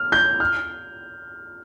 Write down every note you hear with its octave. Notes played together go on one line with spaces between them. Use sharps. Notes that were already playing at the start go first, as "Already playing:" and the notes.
Already playing: F6
G6
F6